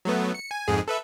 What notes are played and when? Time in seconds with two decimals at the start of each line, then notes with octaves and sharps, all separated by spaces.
0.05 F#3 A3 B3
0.34 C#7
0.51 G#5
0.68 F2 G#2 G#4
0.88 A4 B4 E5